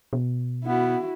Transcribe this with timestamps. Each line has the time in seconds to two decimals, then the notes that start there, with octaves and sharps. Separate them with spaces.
0.13 B2
0.65 B3 E4 F#4